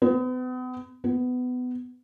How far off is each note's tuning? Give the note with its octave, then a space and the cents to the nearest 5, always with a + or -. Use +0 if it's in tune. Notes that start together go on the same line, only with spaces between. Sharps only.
B3 +40
B3 +20